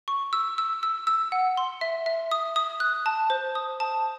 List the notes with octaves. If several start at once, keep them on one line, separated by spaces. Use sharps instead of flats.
C#6
E6
E6
E6
E6
F#5
C6
E5
E5
D#6
D#6
F#6
A5
C5
D#6
A5